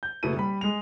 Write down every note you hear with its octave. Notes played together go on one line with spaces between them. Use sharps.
G6
F#1 B2 A3 E4 D#7
G3 B5
G#3 F7